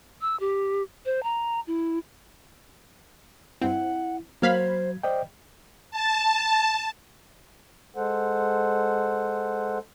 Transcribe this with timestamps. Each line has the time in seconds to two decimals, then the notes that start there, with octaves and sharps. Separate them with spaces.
0.21 E6
0.40 G4
1.05 C5
1.23 A#5
1.67 E4
3.62 G2 C4 E4 F#5
4.42 F#3 A#3 C5 F5 B5 G#6
5.03 C5 D5 D#5 G5
5.91 A5
7.96 G#3 A4 C5 F#5